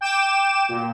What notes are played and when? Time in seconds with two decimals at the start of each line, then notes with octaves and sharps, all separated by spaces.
0.01 G5 D6 E7
0.69 A#2